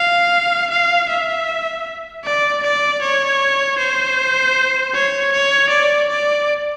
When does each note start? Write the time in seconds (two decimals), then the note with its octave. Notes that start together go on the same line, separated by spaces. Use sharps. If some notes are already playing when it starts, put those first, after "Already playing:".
Already playing: F5
0.71 F5
1.09 E5
2.24 D5
2.63 D5
3.02 C#5
3.79 C5
4.94 C#5
5.32 C#5
5.70 D5
6.09 D5